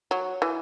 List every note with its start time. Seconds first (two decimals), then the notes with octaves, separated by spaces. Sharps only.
0.11 F#3
0.42 E3